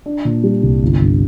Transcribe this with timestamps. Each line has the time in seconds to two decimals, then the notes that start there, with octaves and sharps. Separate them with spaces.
0.06 D4
0.25 A#2
0.43 G3
0.63 C2
0.83 G1
1.02 G2